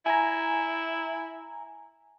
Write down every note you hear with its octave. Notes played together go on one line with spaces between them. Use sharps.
E4 G#5 A#5